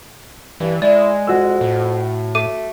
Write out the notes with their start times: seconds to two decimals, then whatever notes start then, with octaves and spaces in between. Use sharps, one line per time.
0.60 G2 E3
0.82 G#3 E4 D5
1.27 F2 F#4 E6
1.61 A2
2.35 A3 D6 D#7